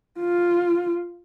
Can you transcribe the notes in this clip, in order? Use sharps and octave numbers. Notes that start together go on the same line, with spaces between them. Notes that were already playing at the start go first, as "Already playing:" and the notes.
F4